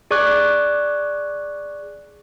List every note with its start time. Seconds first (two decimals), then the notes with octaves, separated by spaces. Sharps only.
0.11 G#4 D5 C#6 D6 F#6